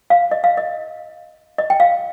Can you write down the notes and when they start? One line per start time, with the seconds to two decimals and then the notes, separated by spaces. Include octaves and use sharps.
0.10 F5
0.31 D#5
0.44 F5
0.57 D#5
1.58 D#5
1.70 G5
1.80 F5